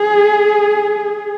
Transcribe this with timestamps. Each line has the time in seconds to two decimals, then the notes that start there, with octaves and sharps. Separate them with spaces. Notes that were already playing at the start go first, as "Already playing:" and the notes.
Already playing: G#4